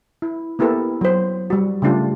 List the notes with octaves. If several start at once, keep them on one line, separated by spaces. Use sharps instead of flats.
E4
A#3 B3 E4 G4 A4 A#4
F#3 C5
G3 F#4
C#3 G3 A3 D4 F4 G4